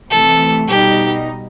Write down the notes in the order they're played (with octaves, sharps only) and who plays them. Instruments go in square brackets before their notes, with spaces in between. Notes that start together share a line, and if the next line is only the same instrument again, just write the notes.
[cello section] C3 E3 A3 [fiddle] A4
[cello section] B2 G3 D#4 [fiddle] G4